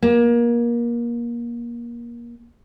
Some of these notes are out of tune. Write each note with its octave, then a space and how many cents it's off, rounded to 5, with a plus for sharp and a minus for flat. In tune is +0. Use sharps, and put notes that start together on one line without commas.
A#3 +25